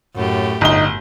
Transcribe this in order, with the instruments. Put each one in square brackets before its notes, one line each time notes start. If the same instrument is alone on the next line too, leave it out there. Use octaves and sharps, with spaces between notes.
[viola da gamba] F#2 A2 G4
[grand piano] G1 G7 [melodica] D#4